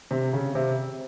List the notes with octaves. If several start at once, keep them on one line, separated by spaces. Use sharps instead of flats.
C3
C#3
C3